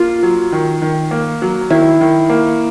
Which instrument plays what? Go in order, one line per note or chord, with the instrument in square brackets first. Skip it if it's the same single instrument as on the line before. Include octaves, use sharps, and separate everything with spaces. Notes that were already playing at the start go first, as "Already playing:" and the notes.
Already playing: [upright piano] A#3 [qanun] F4
[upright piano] F#3
D#3
D#3
A#3
F#3
[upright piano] D#3 [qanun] E4
[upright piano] D#3
A#3